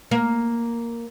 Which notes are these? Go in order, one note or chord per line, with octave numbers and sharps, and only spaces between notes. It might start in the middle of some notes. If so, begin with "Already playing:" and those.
A#3